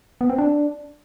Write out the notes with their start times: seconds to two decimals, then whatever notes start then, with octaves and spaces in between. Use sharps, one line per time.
0.21 B3
0.30 C4
0.38 D4